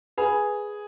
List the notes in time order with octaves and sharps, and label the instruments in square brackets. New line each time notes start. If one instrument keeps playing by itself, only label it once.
[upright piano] G#4 [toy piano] B4 F#5 B5